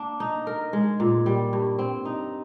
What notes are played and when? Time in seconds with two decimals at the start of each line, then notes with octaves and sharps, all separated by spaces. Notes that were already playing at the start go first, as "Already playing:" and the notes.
Already playing: A#3 D4
0.20 D#4
0.47 A#4
0.73 G#3
1.00 A#2
1.26 G3
1.53 G2
1.79 C4
2.05 D#4